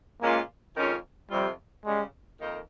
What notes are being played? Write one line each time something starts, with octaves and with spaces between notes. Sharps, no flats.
A#2 G#3 A#3 C#4 F4
F2 D#3 G#3 C#4 F4
F2 C3 F3 G3 C4 F4
C#3 G3 G#3 C#4
F2 D#3 A#3 D#4